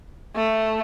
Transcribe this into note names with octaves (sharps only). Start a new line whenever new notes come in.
A3